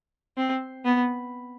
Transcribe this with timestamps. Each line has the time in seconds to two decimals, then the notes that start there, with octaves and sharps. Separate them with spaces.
0.37 C4
0.85 B3